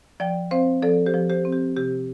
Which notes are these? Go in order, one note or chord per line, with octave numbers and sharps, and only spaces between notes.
F3 D5 G5
C4 C5 F5
F3 A4 D5
G4 C5
F3
G4 C5
C4
G4
C3 G4